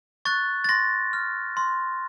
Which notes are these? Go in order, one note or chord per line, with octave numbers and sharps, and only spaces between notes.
C#6 F#6 A6
A6
C6 A#6
F6
C6